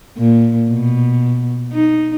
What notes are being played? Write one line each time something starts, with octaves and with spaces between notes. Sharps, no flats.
A#2
B2
D#4